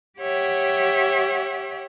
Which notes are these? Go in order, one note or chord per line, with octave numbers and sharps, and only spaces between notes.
G4 C#5 E5 F#5 G5